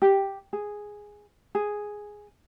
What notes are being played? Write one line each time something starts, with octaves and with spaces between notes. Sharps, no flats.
G4
G#4
G#4